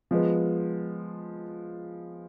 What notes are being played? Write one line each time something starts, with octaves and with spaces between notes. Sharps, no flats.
F3 G#3 B3